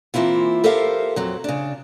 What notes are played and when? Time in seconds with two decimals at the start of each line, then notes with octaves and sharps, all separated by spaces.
0.14 E3 A#3 C4 E4 F4
0.64 G4 A4 A#4 C5 E5 F5
1.16 F2 F#3 C4
1.44 C#3 D4